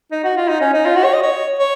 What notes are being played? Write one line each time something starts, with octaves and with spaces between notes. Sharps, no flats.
D#4
F#4
F4
D#4
C#4
D#4
F4
F#4
C#5
D#5
C#5
C#5